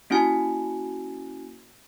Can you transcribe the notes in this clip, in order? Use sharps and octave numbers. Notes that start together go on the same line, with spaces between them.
A#3 C#4 E4 F#4 G#5